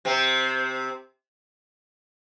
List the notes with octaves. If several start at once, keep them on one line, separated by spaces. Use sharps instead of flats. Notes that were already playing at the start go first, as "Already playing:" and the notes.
C3 C4